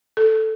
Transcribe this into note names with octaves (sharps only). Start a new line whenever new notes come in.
A4